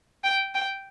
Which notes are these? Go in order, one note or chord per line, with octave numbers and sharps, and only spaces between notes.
G5
G5